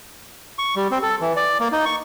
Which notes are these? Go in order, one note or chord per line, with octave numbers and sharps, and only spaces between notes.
C#6
G3
C4
A4
E3
D5
A#3
D#4
C#6